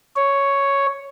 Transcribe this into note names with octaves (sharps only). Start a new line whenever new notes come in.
C#5